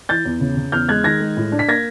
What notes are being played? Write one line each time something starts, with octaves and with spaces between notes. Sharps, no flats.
E3 G6 A6
E2
C#3
C#3
E2 F6 G6
G#3 F#6 G#6
D#3 G#6 A#6
G#3
A2
D4
B6
A#3 G#6 A#6